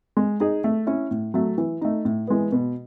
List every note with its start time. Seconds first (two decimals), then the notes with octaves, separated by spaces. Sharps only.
0.17 G#3
0.40 D#4 G#4
0.64 A3
0.87 C#4 E4
1.11 A2
1.34 F#3 A3
1.58 E3
1.81 A3 D#4
2.05 A2
2.27 E3 G#3 B3
2.52 B2